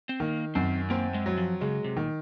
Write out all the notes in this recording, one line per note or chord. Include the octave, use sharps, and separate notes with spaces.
C4
D#3 A#3
F#2 C4
A#3 C4
G#3
F#3
F3
C#3 G#3
C3
A#2 D#3